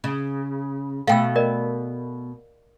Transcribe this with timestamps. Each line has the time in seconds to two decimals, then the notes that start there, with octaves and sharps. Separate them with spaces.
0.04 C#3
1.07 B2 A3 F5 G5 E6
1.36 A#4 D5 D#5